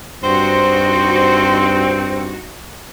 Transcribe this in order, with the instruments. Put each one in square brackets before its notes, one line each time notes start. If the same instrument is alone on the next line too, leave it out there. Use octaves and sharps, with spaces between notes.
[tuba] G2 [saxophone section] C4 [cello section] D#4 F#4 [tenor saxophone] C5